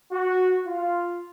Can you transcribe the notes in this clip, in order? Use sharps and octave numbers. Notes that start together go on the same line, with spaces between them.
F#4
F4